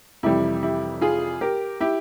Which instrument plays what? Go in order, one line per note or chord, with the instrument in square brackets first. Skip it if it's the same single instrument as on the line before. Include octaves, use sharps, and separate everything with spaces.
[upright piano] F2 C3 E3 G3 E4 G4
E4 G4
F4 G#4
G4 A#4
E4 G4